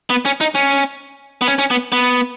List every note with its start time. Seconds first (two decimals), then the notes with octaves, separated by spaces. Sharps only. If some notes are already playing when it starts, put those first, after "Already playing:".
0.10 B3
0.25 C#4
0.41 D#4
0.55 C#4
1.41 B3
1.48 C#4
1.59 C#4
1.71 B3
1.92 B3